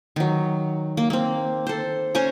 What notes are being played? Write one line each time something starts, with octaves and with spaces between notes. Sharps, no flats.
D#3 F#3
A#3
A#3 C4
A4 C5
C#4 C5 G#5 A#5